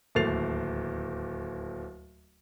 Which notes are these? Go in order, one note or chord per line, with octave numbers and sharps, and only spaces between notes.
D1 D#2 A3 A6 C7 F7